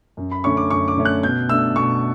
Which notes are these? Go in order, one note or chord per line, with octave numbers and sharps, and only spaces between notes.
F#2
B5
D3 A3 C#4 C#6
D6
F#2 C#6
D6
D3 A3 C#4
F#6
B2 G6
A3 D4 E6
B2 C#6